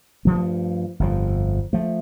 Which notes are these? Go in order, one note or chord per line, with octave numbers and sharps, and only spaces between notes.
G2 F3 A3
G1 F2 F3
F3 A3